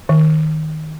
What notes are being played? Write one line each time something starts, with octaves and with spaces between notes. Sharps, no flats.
D#3